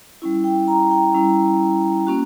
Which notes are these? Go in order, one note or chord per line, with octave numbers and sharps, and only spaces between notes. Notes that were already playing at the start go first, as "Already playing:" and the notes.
G3 C#4 E4
G5
A#5
G5
G3 C#4 E4
A#3 C#4 F#4